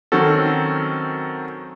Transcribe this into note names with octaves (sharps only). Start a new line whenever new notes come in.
D#3 F#3 C4 C#4 F#4 A4